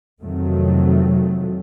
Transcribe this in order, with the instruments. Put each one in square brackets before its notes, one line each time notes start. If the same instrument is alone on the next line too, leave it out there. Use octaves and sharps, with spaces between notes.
[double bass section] F2 C3 D#3 F#3 A3